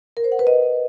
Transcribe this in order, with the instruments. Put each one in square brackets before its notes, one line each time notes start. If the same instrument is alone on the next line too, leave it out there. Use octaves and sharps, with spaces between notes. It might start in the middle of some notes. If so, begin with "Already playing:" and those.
[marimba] A#4
C5
F#5
B4
D#5